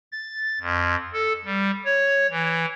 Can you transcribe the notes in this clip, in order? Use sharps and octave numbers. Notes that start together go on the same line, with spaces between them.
A6
F2
A4
G3
C#5
E3